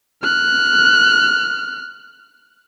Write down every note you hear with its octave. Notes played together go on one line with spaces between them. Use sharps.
F6 F#6